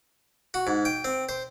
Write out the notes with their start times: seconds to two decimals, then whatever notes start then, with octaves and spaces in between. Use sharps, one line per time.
0.54 F#4
0.67 G#2
0.85 G5
1.05 C4
1.29 C5